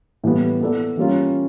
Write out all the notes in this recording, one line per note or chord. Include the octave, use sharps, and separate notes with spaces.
A2 E3 G3 B3
B3 E4 A4 D5
E3 G3 A#3 C#4 F4